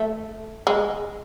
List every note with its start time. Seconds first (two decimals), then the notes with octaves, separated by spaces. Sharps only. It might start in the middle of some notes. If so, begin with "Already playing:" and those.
Already playing: A3
0.67 G#3